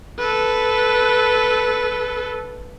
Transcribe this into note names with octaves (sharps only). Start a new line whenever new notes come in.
A4 B4